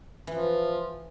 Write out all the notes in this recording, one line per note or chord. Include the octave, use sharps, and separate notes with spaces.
E3 F3